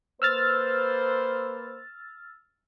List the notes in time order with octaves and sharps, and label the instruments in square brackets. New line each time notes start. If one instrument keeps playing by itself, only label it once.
[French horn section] A#3 B4 C5 [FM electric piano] E6 F6 A6